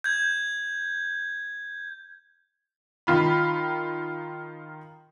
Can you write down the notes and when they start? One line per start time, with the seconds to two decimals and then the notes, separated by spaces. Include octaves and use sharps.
0.04 G6 G#6
3.07 D#3 F4 B5